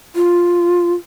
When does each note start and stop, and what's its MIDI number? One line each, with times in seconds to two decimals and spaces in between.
0.15 0.94 65